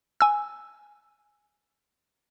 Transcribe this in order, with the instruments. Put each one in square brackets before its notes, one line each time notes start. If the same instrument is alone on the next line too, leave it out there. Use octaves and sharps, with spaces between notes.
[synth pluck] G#5 E6